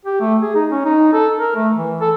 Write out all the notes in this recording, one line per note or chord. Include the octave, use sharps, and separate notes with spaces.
G4
A3
G#4
D#4
C#4
D#4
A4
A#4
A3
E3
A4